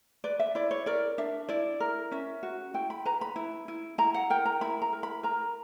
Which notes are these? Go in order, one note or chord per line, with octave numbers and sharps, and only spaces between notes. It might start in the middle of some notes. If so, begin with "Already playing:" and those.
B4 D5
E5
E4 D5
C#5
A#4 D5
D4 E5
E4 D5
A#4
C#4 E5
F#4
E4 G5
B5
B4 A#5
B5
E4
E4
E4 A#5
F#5
A#4 G5
A#5
E4 B5
A#5
A#4
B5
A#4 A#5